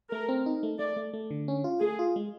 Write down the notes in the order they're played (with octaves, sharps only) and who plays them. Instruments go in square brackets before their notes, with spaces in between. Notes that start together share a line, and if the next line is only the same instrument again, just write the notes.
[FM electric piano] A3 [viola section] A#4
[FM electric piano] C4
D#4
A3
[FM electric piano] A3 [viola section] D5
[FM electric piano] A3
A3
D3
C#4
F4
[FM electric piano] A3 [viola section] G#4
[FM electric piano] F4
G#3